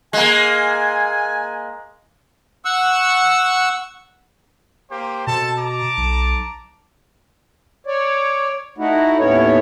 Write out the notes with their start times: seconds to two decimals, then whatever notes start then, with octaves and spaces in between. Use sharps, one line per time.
0.13 G#3 A#3 G#5
2.65 F#5 C#6 E6
4.90 A#3 G4 C5
5.27 B2 C4 A4 A5
5.59 A5 A#5 D6
5.97 B1
7.87 C#5 D5
8.78 A3 D#4 E4 F#4
9.19 D#2 A2 B3 C#4 E4 C#5